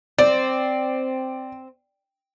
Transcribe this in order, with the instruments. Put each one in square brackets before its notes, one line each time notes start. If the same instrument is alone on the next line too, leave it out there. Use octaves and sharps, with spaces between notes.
[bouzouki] C4 [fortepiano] D5